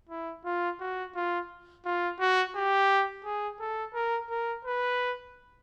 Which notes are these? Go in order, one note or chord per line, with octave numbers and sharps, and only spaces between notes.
E4
F4
F#4
F4
F4
F#4
G4
G#4
A4
A#4
A#4
B4